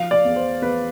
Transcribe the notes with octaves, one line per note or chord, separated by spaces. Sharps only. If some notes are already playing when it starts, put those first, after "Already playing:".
Already playing: F3 F5
D5
E2
C5
E2 B4